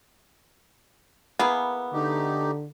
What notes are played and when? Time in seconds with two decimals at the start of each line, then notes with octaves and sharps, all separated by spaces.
1.39 A#3 B3 E4 G#4
1.93 D3 A3 D#4 G4